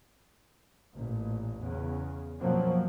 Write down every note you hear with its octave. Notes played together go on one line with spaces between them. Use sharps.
A1 A#2
E2 C#3
F#2 B2 F3 F#3 A#3 C4